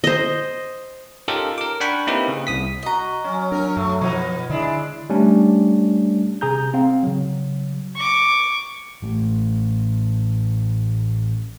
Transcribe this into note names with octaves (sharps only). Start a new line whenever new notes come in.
C5 D#5
C#4 D#4 F4 G4 A4 A#4
A#4 D6
D4 F#5 G5 B5 C#6
A#3 C4 D#4 E4 G4 B4
C#3
C2 D#6 B6
F#4 D#5 A#5
F#3 C#4
C#4 D4 A#4
F#2 A3
B2 F3 B3 D#4
D3 G#3 D4 E4
G3 A3 C#4 D4
C3 G#4 A#5 G6
C4 F5
C#3 F#3
C#6 D6
A1 A2